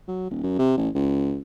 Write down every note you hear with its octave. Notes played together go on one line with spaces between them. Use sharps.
F#3
D#1
F#2
C3
A1
C#2